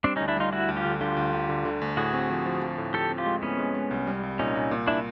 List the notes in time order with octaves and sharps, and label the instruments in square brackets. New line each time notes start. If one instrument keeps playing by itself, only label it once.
[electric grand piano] G3 [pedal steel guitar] C4 D4
[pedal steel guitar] C#4 D#4
[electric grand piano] D2
[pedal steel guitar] D4 E4
[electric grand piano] G3 [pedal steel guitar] D#4 F4
[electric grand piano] D2 [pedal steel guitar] E4 F#4
[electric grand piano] D2
[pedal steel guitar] F4 G4
[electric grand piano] D3
[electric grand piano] D3 [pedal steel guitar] F4 G4
[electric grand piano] D2
D2
D3
D3
D2
[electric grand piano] A2 [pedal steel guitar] F#4 G#4
[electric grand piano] C4
F3
F3
F3
A2
[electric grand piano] F3 [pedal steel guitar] G4 A4
[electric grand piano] C4
[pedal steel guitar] F4 G4
[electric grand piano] G#3
[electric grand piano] A2 [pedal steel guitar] B3 C#4
[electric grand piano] G#3
G#3
C2
G3
C2
[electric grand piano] A#2 [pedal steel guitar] C#4 D#4
[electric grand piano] A#2
A#2
[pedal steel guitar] D4 E4